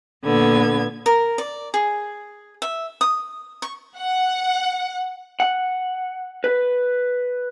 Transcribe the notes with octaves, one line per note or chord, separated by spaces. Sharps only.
A#2 D3 B3 G#6
A#4
D5
G#4
E5
D#6
C#6
F#5
F#5
B4